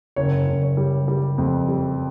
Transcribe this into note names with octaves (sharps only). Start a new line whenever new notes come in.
F#1 C#5
F#1
C#5
G3
G3
F2
G3